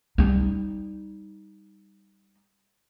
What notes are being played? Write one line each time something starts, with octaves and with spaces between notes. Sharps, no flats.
G3 D#4